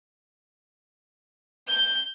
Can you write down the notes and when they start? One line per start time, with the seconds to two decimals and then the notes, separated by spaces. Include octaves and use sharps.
1.70 G6